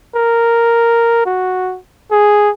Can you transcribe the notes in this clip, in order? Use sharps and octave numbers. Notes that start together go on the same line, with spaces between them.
A#4
F#4
G#4